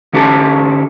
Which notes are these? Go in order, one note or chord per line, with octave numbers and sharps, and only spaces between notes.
D3 C#4 G4 A4 A5